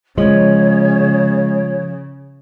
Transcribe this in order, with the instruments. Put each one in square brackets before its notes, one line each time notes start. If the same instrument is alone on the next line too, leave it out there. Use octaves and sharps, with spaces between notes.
[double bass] C#3 [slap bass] F3 [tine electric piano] G#3 [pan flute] C#5